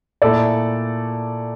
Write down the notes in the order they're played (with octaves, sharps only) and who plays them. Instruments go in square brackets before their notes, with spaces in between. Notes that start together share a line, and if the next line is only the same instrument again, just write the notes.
[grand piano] A#2 A3 E4 A4 D5